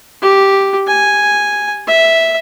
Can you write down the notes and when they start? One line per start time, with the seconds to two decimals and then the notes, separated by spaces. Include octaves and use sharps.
0.22 G4
0.88 G#5
1.87 E5